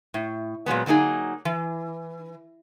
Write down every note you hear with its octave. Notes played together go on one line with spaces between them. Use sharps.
A2
A#2 F#3 G#3 B3
D3 F#3 A#3 D#4 G#4
E3